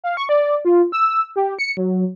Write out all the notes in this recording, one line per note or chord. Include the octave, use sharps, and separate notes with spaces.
F5
C#6
D5
F4
E6
G4
C#7
F#3